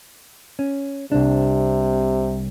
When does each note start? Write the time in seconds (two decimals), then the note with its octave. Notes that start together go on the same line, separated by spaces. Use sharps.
0.59 C#4
1.12 C2 C3 D4